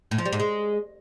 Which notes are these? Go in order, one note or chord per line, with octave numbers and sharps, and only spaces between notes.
A2
F3
G3
G#2
G#3